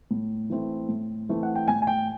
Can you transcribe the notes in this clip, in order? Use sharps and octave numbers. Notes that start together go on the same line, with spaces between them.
A2
E3 A3 C4 E4
A2
E3 A3 C4 E4
F#5
G5
A2 G#5
G#5
G5